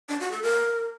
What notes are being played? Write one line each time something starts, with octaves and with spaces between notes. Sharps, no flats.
D4
F#4
A4
A#4